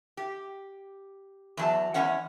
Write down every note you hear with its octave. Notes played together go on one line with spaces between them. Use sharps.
G4
E2 F#3 A5
E2 G2 G#3 C#4 C#5 F#5